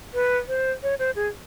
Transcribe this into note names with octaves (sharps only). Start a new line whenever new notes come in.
B4
C5
C#5
C5
G#4